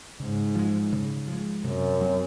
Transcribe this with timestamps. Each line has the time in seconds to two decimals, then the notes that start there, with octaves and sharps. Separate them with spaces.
0.20 G#2 C#3
0.55 F3 G#3
0.92 C#3
1.28 F3 G#3
1.64 F#2 C3
2.01 F#3 C4